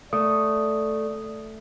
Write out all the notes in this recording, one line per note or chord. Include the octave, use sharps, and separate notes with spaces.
A3 D5 D#6